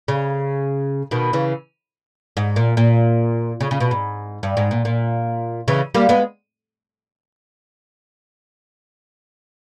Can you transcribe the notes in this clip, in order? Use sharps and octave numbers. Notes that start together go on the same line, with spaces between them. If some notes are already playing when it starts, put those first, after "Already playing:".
C#3
B2 D#3
C#3 E3
G#2
A#2
A#2
C#3
C#3
B2
G#2
G2
G#2
A#2
A#2
C#3 E3
G3 A#3
G#3 B3